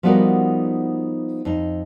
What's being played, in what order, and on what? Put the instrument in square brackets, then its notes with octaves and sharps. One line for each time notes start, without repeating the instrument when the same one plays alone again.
[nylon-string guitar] F3 G3 B3 D#4 F#4 A#4
F2 D#4